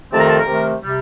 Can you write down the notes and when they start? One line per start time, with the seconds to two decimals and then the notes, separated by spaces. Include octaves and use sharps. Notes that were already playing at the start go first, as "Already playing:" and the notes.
0.12 F2 C3 D#3 A3 C4 A5
0.20 A#5
0.29 A5
0.38 A#4
0.47 C3 D#3 A3
0.82 C3 G3